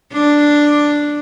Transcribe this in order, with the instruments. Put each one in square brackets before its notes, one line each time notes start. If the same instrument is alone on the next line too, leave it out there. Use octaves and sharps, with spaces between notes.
[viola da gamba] D4